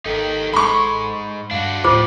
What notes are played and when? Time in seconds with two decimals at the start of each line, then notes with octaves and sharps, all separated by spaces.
0.06 G#1 D#4 G4 A4 A#4
0.53 G#2 C#3 G#3 B5 C#6
1.51 G2 D4 F#4 F5
1.84 D2 A2 F3 G3 F4 C5 D6